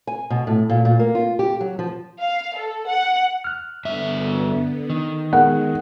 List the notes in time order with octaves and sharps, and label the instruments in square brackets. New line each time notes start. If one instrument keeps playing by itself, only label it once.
[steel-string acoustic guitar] G#5
B2
A2
A#2
A#2
A#3
F4
G4
F#3
F3
[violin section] F5
A4
F#5
[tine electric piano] F6 F#6
[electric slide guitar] G2 E5 [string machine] D3 B3
[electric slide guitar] D#3
[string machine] G#3 [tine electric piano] B3 G#4 A#4 [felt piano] F#5